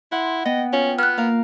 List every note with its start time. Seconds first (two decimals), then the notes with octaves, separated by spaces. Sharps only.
0.12 E4 F#5 C6
0.45 B3 D#5 G5
0.73 C#4 F4
0.99 B3 F6 F#6
1.18 A#3 A#4 F5